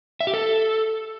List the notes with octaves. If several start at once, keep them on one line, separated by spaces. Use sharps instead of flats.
E5
G4
A4